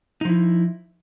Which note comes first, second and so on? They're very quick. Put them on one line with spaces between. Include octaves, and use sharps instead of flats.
D#4 F3 E4